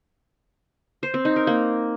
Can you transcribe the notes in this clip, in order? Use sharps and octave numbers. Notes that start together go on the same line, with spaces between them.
C5
C4
D#4
A#4
A#3